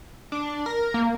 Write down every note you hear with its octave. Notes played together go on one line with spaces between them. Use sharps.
D4
A#4
A#3